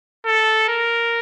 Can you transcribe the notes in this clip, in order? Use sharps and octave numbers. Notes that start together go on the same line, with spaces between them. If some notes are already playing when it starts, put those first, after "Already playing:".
A4
A#4